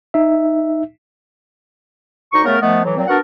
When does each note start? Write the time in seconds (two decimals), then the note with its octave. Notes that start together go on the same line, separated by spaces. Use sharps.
0.14 D#4 E5
2.33 D2 D#4 C#6
2.45 C#3 A3 B3 A#4
2.62 D#3 F3 A3 B3
2.85 A2 E3 F#3
2.97 A#2 F#3 C4
3.08 B3 D4 F#4 A#4 F#5